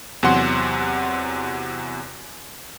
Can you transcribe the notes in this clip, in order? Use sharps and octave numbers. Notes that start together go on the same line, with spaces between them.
E2 C3 F#3 F#5 C6